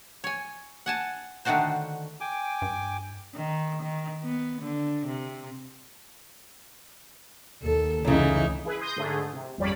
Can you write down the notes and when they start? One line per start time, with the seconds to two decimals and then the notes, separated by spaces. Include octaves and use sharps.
0.24 C#5 G#5
0.86 F#5 G#5 A5
1.45 D3 D#3 A3 D4 F#4 C5
2.21 G5 G#5 D6
2.62 G2
3.35 D#3
3.82 D#3
4.22 B3
4.62 D3
5.06 C3
7.62 D#2 A4
8.05 F1 C#2 F#2 C#3 E3 D#4 E4
8.65 E4 G#4 B4
8.81 C6 D#6 G6 A#6
8.96 G#2 D3 A3 G#4
9.33 C3
9.58 G#1 F2 G3 C#4 D5 B5